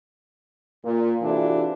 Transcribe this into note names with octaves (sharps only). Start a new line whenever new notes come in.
A#2
C3 E3 D4 F4 F#4 A4